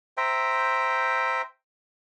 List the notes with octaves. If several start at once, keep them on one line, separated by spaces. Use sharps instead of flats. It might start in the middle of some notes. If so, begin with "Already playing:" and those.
C5 E5 G5 A#5